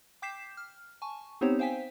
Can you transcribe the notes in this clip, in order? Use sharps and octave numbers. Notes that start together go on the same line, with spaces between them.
G5 D6 G6 B6 C7 E7
F6
G#5 A5 C#6
B3 C4 D#4 G4 C5 C#5
C5 F5 G5 G#5 B6